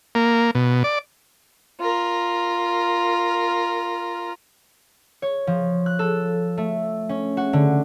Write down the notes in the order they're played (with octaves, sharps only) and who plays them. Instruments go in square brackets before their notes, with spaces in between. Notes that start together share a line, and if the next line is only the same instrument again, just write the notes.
[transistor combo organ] A#3
B2
D5
[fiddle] F4 A#4
[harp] C#5
F3
F#6
A4
A3
C#4
F#4
D3